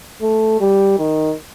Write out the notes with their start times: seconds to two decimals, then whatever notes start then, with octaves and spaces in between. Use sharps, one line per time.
0.22 A3
0.60 G3
0.99 D#3